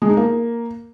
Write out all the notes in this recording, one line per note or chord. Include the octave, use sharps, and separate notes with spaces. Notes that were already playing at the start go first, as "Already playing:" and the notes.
G#3
D#4
A#3